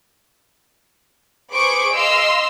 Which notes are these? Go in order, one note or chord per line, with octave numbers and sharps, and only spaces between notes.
G#4 B4 C5 C#6 D6 D7
D#5 F5 C6 E6